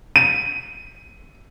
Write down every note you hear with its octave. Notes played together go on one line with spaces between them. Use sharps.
D#7